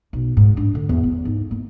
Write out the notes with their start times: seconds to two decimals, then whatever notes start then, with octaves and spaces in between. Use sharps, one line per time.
0.13 B1
0.37 G#2
0.57 D4
0.75 D3
0.89 E2
1.04 F3
1.25 G#2
1.51 A#3